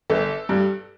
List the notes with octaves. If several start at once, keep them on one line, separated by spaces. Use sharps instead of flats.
G1 A4
G2 G3